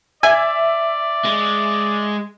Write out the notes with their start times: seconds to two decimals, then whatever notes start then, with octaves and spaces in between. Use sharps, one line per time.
0.23 D5 E5 G#5
1.25 G#3